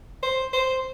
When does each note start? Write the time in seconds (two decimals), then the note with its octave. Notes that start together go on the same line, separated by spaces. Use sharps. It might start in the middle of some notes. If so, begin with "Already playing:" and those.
0.23 C5
0.53 C5